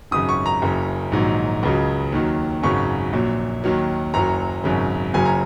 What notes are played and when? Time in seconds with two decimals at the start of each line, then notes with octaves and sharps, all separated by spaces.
0.11 G#1 F#2 C#3 D#6
0.29 C#6
0.46 A#5
0.62 F#1 F#2 C#3
1.12 A#1 G#2 D#3 F#3
1.63 C#2 C#3 F#3
2.12 D#2 D#3 F#3
2.63 G#1 F#2 C#3 F#3 C#6
3.13 A#1 A#2 F#3
3.64 D#2 D#3 F#3
4.14 F#1 F#2 F#3 A#5
4.64 G#1 F#2 C#3
5.14 F#1 F#2 C#3 F#3 G#5
5.25 A#5